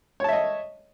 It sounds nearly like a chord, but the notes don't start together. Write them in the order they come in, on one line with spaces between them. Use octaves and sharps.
C#5 A5 E5 D#5